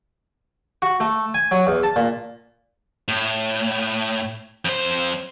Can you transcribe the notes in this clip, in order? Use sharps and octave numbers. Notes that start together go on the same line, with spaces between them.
F#4
A3
G#5
F#3
E2
A5
A#2
A2
F2 C5